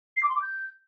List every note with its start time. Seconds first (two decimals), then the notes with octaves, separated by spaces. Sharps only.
0.17 C7
0.23 D6
0.29 C6
0.36 D6
0.42 G6